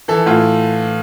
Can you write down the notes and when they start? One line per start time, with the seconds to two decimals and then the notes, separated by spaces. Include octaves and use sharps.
0.08 E3 A4
0.26 A2 F4